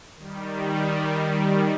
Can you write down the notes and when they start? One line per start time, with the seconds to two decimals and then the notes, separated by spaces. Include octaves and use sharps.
0.17 D#3 G3